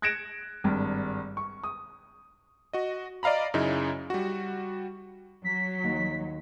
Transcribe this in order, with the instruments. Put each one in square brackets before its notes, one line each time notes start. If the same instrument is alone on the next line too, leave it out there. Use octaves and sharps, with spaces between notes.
[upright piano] F#6 G#6 A#6 C#7 D7 E7
G#1 G2
C#6
D#6
[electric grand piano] F#4 D#5
D5 D#5 F5 A#5 B5
F#2 C#3 D#4 E4
G3 F#4
[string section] F#3 [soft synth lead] B6
[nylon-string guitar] D#2